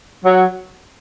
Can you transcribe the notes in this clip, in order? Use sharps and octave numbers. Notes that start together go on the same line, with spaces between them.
F#3